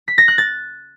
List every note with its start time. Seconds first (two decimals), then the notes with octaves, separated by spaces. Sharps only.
0.08 B6
0.18 A#6
0.28 F#6
0.38 A6